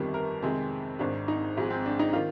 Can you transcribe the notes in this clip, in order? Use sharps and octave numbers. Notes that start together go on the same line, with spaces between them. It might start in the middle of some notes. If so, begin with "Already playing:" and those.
Already playing: G1 F2 D#3 G3
A#4
F2 C3 D#3 G#3 C4
G#1 G#2 D#3 D4
D#4
G#1 G#2 F3 G#3
C4
D4
D#4
D#3 F4